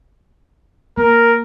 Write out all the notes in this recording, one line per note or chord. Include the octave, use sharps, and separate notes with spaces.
A#3 A#4